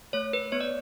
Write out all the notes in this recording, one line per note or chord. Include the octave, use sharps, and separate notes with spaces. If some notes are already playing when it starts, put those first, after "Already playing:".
A3 C#5
B4
B3 C#5
D5